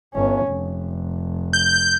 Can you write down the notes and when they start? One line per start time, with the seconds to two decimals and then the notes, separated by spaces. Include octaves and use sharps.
0.14 G1 C#4
0.48 F1
1.53 G6